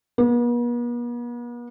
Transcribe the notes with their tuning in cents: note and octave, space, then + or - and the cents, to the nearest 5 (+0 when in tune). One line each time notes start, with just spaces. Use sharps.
B3 -45